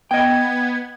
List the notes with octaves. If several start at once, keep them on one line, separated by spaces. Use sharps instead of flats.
B3 D#5 G5 G#6